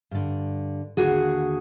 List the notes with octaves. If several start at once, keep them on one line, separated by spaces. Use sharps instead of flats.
G2 D3
D#2 D3 F#4 G#4